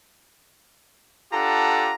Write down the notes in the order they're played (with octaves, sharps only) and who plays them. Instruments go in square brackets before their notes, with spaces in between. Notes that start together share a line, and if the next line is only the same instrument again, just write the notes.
[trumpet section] D4 F4 G4 A4 F#5 A#5